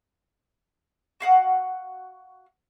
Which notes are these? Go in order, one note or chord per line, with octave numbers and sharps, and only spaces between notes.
F#4 F5 F#5 D#6